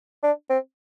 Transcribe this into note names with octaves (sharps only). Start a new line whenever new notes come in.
D4
C4